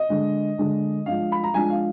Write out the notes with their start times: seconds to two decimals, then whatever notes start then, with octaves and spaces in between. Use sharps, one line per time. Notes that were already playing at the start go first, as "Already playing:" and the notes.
Already playing: D#5
0.09 D3 G#3 D4
0.58 D3 G#3 D4
1.06 F3 G#3 D4 F5
1.32 B5
1.44 A#5
1.54 F3 G#3 D4 G#5
1.70 F5